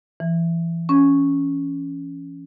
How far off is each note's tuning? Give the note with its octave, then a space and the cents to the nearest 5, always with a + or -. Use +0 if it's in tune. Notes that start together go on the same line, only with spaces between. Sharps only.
E3 +25
C#4 +10